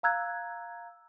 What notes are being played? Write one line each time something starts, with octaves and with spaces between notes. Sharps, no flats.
F5 A#5 E6 F#6 G#6